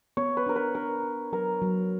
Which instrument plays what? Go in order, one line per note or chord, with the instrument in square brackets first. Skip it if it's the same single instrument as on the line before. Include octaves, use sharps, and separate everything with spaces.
[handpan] B3 [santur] C#5
[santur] B4
[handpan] D4 [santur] A#4
[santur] B4
[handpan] D4 [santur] A#4
[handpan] D4
[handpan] F#3 [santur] A#4
[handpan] F#3